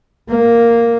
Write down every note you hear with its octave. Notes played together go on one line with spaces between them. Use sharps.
A#3